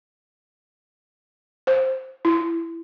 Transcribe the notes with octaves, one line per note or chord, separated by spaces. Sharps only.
C5
E4